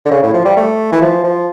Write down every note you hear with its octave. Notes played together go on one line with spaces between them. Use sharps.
D3
C#3
A2
F3
G3
A3
E3
F3
F3